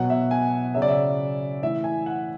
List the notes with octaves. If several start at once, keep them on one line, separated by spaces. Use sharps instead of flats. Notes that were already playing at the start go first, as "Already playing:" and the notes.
Already playing: B2 F#3 F#5
E5
G#5
C#3 F#3 E5
D5
E5
A2 E3 E5
G#5
F#5